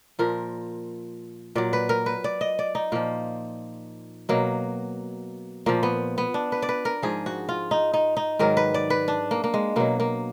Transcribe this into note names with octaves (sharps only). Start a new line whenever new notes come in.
A#2 F3 A#4
A#2 F#3 D5
B4
A#4
B4
D5
D#5
D5
D#4
A#2 F3 A#3
B2 F#3 A#3
A#2 F3 A#3
B3
B3
D4
B4
D5
B4
A#4
G#2 F3 G#4
F#4
F4
D#4
D#4
D#4
G#2 D#3 F#3 A#4
B4
D5
B4
D4
A#3
A#3
G#3
B2 F#3 A#3
A#3